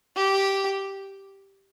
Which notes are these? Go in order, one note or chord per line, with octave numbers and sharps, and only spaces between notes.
G4